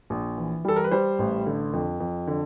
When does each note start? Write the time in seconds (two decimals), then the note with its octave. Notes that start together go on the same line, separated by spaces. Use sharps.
0.10 A#1
0.37 E3
0.65 G3 A4
0.76 A#4
0.84 B4
0.91 G3 C5
1.19 A1
1.46 D3
1.73 F2
2.00 F2
2.27 D3